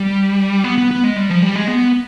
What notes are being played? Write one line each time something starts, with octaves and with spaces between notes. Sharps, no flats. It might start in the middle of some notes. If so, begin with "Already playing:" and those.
Already playing: G3
B3
B3
B3
G#3
G3
F3
G3
G#3
B3